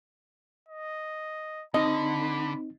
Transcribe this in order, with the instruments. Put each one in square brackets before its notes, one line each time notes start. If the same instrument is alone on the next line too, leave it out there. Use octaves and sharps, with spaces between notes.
[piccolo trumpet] D#5
[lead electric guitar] D3 [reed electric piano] C4 D#4 [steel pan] D#5 [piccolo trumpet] B5